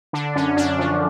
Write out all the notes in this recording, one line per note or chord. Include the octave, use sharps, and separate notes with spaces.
D3 D4
F#2 C#4
F#2 D4
F3